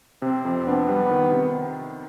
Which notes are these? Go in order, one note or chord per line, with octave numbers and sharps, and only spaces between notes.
C3 C4
F2
B3 D4
G3
D#3
C3